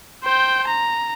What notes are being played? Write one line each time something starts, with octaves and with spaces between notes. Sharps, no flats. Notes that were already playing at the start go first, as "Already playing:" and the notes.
C5 G5
A#5